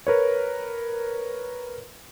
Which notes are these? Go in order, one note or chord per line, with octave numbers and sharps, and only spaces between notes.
A#4 B4 C#5